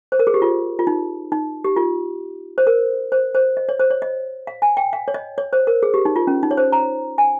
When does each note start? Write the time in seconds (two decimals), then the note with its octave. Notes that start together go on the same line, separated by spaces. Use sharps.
0.12 C5
0.19 A#4
0.27 G#4
0.34 G4
0.42 F4
0.79 F4
0.87 D#4
1.32 D#4
1.64 G4
1.76 F4
2.58 C5
2.67 A#4
3.12 C5
3.35 C5
3.57 D#5
3.69 C#5
3.80 C5
3.90 C#5
4.02 D#5
4.47 F5
4.62 G#5
4.77 G5
4.93 F5
5.08 C#5
5.14 D#5
5.38 C#5
5.53 C5
5.67 A#4
5.83 G#4
5.94 G4
6.05 D#4
6.16 F4
6.27 C#4
6.43 D#4
6.51 C#5
6.57 C5
6.72 A#5
7.18 G#5